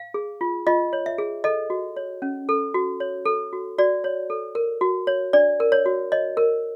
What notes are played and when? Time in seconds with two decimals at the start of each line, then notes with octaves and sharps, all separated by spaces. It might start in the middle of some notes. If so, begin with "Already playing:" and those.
Already playing: F5
0.14 G#4
0.41 F4
0.67 F4 D#5
0.93 C#5
1.06 E5
1.18 G#4
1.44 A4 D#5
1.70 F#4
1.97 C#5
2.22 C#4
2.49 A4
2.74 F#4
3.00 C#5
3.26 A4
3.53 F#4
3.78 F#4 D5
4.04 C#5
4.30 A4
4.55 A#4
4.81 F#4
5.07 C#5
5.33 D4 D5
5.60 A#4
5.72 C#5
5.86 F#4
6.12 C#5 D#5
6.37 A#4